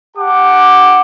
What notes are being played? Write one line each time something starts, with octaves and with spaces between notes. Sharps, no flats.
G4 F#5 A5 D6